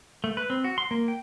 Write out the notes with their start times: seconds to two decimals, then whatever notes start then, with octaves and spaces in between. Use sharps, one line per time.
0.24 A3
0.37 B4
0.50 C4
0.64 F#4
0.78 C6
0.91 A#3
1.08 G5